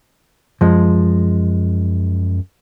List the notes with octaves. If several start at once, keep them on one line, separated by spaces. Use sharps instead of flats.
F#2 F3 G#3